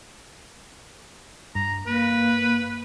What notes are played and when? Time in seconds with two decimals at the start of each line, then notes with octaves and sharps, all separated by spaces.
1.55 G2 A#5
1.86 A#3 B4